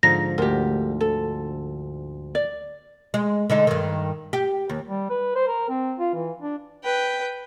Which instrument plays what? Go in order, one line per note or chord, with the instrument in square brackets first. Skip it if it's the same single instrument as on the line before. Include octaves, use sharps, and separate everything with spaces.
[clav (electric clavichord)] G#2 D3 F3 [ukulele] D#4 [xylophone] A#6
[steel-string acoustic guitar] D2 [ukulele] G4 A#4
[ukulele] A4
D5
[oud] G#3
D3 G#3 D#4
G2 D#3
G4
D#2
[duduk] G3
B4
C5
A#4
C4
F4
E3
D4
[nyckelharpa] B4 [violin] G5